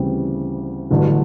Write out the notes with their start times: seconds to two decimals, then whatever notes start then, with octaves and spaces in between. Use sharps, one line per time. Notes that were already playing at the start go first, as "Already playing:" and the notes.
Already playing: D2 C#3 E3 G3 C4
0.90 A1 G2 D3 F#3